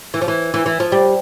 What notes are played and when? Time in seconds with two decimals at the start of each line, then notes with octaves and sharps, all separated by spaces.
0.14 E3
0.22 F3
0.28 E3
0.54 E3
0.66 E3
0.80 F3
0.92 G3